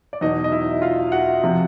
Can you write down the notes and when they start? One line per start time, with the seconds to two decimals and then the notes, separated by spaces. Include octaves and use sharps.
0.13 D5
0.21 E2 B2 F#3 D#4 D#5
0.44 D#5
0.52 E4 E5
0.82 F4 F5
1.12 F#4 F#5
1.43 C3 F3